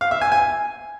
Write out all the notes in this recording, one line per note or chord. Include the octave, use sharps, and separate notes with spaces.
F5
E5
G#5
G#5